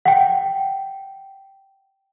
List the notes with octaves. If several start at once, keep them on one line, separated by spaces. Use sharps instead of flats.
F#5 G5